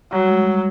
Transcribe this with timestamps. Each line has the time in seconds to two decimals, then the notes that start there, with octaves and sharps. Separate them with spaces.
0.12 F#3 G3
0.28 G#3
0.43 G3